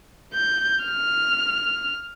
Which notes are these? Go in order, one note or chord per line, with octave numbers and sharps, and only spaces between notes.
G6
F6